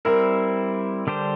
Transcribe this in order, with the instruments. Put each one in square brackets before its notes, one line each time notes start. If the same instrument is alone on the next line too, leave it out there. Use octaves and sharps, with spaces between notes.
[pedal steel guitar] G3 C4 E4 [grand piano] A#4
[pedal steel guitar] D3 G3 D4 G4 C5